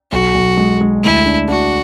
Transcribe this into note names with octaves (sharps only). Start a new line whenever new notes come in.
B1 F#4
B1
G#3
G#3
D2 E4
D4
D4 F#4